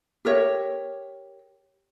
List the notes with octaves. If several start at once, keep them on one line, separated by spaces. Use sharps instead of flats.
G4 A#4 C#5 E5